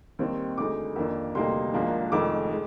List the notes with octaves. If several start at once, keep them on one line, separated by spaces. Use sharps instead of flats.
D#2 D#3 G3 C4
D2 D3 G#3 D#4 D6
F2 D#3 A#3 D4
D2 C3 G3 A#3 D#4 C6
G#1 G#2 F3 A#3 D4
F1 F2 D#3 G#3 D#4 D6
G#3